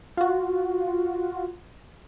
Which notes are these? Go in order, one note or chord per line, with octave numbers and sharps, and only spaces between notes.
F4 F#4